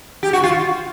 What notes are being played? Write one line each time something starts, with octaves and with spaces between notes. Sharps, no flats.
G4
F#4
F4